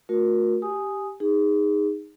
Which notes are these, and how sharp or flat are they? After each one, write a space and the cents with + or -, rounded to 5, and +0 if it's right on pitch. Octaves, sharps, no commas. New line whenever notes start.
A3 +0 F#4 -35 A#4 +10
G4 +0 G#5 +5 D#6 +0
D#4 +0 G#4 -20